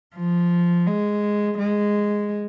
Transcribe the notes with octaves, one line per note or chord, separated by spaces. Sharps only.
F3
G#3
G#3